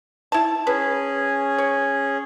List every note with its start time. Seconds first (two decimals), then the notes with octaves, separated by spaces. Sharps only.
0.32 E4 A5
0.67 C#4 G#4 B4
1.58 C#5